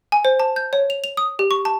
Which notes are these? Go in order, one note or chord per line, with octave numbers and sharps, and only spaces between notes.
G#5
C5
A5
G6
C#5
F7
F7
D#6
G4
C#6
A5